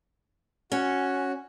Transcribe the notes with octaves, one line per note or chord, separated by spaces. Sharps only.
C#4 F#4